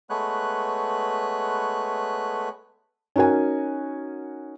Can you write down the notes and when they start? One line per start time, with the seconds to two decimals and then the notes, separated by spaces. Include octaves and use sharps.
0.10 G#3 A3 B3 B4 C#5 F#6
3.16 C#4 D#4 F#4 A#4 G#5